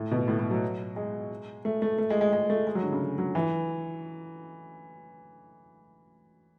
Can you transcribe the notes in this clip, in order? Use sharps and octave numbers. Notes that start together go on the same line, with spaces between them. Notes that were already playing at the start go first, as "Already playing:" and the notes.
Already playing: A2
B2
A2
A2
F#3
G#3
A3
A3
A3
G#3
G#3
G#3
A3
G#3
F#3
D3
C#3
F#3
E3